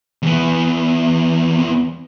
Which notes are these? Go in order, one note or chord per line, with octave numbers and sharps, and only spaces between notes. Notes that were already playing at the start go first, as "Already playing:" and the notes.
E2 B3